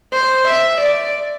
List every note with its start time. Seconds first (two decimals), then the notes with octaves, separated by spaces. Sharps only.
0.13 C5
0.47 E5
0.81 D5